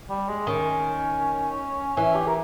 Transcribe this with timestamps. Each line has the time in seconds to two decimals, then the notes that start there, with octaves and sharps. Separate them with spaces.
0.09 G3
0.28 G#3
0.47 D#3 C#4
1.97 E3 C#4
2.15 G4
2.27 A#4